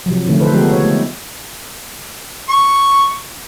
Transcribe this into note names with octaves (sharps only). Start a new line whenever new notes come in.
C3 F3 F#3
D3 D#3 F3 A3
D#4 A4 B4 C5
F3 G#3 B3 G4 A4
C#5
A3
C#6